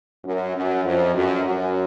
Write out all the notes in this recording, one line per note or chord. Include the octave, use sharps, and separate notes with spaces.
F#2
F#2
F2
F#2
F#2